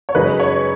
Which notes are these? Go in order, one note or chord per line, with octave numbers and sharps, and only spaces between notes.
C#5
F#2 C#3 G#3 D#4 B4
C#5